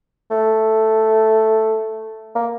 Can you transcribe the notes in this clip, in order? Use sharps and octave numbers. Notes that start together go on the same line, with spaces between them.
A3
A#3